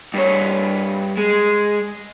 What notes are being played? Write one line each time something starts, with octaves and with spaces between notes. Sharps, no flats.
G2 C#5
G#3